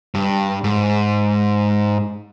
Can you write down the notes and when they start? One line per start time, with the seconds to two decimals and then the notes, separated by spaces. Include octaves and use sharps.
0.15 G2
0.64 G#2